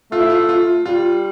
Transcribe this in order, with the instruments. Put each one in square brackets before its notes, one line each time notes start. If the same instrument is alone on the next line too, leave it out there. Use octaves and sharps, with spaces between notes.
[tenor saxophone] A3 [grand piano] F4
[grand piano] E4
F4
F4
[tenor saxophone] G3 [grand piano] F4